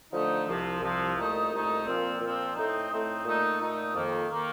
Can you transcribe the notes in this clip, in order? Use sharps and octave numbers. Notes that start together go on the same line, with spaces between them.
D3 F3 A3 D#4
C2 C3 F3
C2 C3 F3
C2 A#2 A3 D#4
C2 A#2 A3 D#4
A#2 F3 C4
A#2 F3 C4
A2 A3 C4 D#4
A2 A3 C4 D#4
A#2 A3 D#4
A#2 A3 D#4
F2 D#3 A#3
D#3 A#3